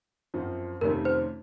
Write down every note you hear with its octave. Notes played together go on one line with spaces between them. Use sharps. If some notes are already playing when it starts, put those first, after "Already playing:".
F#2 F3 C4
F2 C3 D#3 A3 C#4 A#4
C5